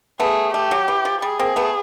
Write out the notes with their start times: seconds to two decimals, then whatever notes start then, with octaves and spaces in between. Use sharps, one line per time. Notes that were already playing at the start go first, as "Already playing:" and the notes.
0.20 A3 B3 G#4
0.54 A3 G4
0.71 F#3
0.88 E3
1.05 F3
1.22 G3 G#4
1.39 A#3 C4
1.56 A3 B3